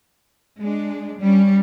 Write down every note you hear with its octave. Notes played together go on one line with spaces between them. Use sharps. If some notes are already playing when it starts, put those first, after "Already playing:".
G#3 D4
G3 C#4